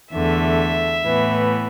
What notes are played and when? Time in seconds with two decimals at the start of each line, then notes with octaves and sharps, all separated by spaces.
0.12 E2 D3 A3 E5
1.05 A2 E3 B3